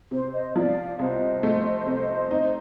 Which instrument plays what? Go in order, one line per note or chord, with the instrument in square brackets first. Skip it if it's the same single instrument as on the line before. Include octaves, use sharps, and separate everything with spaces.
[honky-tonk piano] C3 [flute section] C5
[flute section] C5 D#5
[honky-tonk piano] F3 [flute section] D5 F5
[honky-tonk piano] C2 [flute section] C5 D#5
[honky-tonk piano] A3
C3
D#4